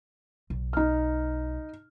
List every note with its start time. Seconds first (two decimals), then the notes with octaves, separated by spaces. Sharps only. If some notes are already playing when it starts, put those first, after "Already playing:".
0.50 B1
0.73 D#4 F6